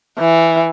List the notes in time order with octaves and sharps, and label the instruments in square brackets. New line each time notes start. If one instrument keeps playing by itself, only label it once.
[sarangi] E3